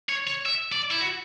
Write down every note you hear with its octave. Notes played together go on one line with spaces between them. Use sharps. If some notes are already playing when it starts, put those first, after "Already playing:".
C#5
C#5
E5
D5
E4
F#4